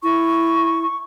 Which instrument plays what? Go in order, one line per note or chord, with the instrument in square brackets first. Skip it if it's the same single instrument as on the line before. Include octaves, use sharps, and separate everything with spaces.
[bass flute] E4 [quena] C#6